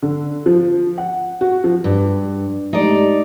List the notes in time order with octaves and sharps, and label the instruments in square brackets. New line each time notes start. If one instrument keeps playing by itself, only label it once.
[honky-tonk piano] D3
F3
F#5
F#4
F3
[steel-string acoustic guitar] G2 [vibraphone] D4
[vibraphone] G#3 A3 G4 [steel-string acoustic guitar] D#4 D5